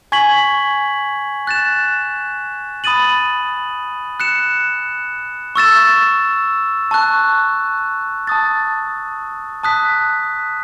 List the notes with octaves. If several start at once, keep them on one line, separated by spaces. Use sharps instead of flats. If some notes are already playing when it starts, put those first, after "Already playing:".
G#5 C#6 G#6 B6 F#7
F#6 A6 E7
B5 D#6 A6 D#7 F#7
F#6 C#7 E7
C#6 E6 A6 E7
A5 C#6 F#6
A5 D#6 A6
A5 D#6 F#6 B6